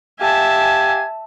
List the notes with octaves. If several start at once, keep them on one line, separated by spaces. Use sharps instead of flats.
G4 E5 F5 G#5 A5